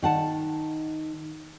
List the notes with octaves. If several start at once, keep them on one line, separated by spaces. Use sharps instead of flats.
D#3 F#5 A5